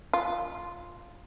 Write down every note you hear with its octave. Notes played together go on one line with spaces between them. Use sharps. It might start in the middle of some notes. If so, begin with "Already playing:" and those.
F4